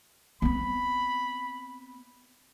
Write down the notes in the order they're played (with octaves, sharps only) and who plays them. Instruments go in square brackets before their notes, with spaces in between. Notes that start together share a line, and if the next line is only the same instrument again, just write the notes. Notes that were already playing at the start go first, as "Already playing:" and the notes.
[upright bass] B3 C4 [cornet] B5